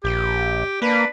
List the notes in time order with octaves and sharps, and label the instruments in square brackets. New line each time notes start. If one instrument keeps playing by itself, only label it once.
[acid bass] A#1 [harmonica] G4
[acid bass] A#3 [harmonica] D4 B4